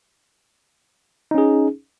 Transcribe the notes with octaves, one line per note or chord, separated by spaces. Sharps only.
C#4 D#4 G#4